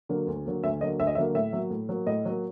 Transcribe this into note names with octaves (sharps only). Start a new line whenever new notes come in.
D3 F#3 A#3
D2
D3 F#3 A#3
D2 E5
D3 F#3 A#3 D#5
D2 E5
D#5
D3 F#3 A#3 E5
A2 E5
F#3 A#3
A2
F#3 A#3
A2 D#5
F#3 A#3